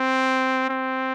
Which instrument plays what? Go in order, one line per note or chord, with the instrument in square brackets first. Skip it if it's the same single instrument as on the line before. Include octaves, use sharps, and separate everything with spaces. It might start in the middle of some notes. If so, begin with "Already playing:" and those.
Already playing: [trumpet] C4
C4